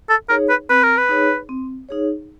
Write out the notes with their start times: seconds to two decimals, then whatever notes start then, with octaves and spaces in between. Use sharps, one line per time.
0.09 A4
0.29 D#4 G#4 A#4 C#5
0.49 B4
0.69 C4 B4
0.83 A#4
0.97 B4
1.09 D#4 G#4 C#5
1.49 C4
1.89 D#4 G#4 C#5